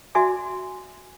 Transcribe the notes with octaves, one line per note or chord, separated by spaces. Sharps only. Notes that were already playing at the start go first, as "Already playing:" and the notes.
F#4 D5 E5 G#5 D6